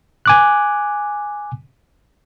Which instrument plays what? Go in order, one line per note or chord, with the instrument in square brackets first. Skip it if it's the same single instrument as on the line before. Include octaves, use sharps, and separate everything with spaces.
[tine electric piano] G#5 D6 F#6